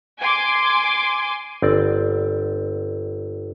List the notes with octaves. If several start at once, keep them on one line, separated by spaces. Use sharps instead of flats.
G#5 C6 D6
G1 C4 D5